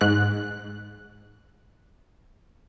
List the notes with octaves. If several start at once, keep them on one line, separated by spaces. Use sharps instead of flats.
G#2 F#6